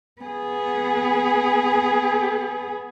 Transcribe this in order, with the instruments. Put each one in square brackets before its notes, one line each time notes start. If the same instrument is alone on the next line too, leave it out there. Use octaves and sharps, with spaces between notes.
[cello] B3 G#4